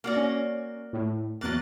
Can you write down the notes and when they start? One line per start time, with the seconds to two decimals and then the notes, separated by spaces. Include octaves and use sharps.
0.04 A#3 F#4 D5
0.16 C#4
0.93 A2
1.41 E2 F#3 A#3 F#6 A6